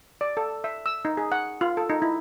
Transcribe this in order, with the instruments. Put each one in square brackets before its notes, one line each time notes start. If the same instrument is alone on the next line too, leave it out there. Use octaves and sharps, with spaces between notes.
[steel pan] D5
A4
E5
E6
D#4
G#4
F#5
F4
A4
D#4
E4